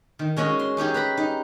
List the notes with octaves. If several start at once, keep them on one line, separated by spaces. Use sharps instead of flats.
D#3
G#3 C#4 F#4 D#5
C6
C#4 D#4 G4 G#4
B4 A#5 B5
D#4